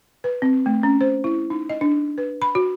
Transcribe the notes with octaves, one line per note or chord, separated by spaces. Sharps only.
B4
C4
A3
C#4
C5
E4
D#4
D#5
D4
B4
B5
F#4